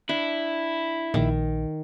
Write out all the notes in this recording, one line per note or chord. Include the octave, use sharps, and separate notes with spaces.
D4 E4
A#1 D#3